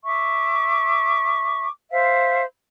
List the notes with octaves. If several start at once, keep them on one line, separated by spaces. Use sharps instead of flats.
E5 C#6 D6
C5 E5 F5